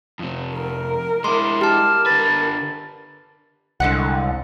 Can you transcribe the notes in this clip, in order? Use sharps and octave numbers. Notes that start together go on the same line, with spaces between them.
F2 C3
A#4
G#3 E4 C6 D6
G4 A#4 A5 F6
D3 B4 A6
C2 D3 G#3 F#5